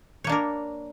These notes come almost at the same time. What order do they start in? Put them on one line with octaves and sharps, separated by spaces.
C#5 A#3 D4 A#4